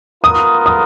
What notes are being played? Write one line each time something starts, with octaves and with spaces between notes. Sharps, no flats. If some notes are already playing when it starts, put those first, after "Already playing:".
B3 F4 A#4 D#6
D#6